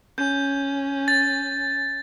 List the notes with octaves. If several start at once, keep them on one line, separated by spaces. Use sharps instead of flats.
C#4 G6
A6